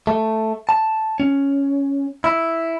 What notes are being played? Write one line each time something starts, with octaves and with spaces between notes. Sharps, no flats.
A3
A5
C#4
E4